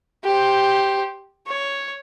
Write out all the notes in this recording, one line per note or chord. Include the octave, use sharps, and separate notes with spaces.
G4 C5
C#5